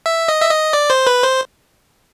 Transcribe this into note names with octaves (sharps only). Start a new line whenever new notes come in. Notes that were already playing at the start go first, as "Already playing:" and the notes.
E5
D#5
E5
D#5
D5
C5
B4
C5